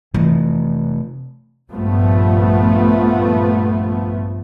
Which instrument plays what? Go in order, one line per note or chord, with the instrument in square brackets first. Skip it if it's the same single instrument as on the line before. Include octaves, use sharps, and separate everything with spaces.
[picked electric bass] C3 A3 [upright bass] E3 F3
[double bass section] A#1 G2 F3 A3 B3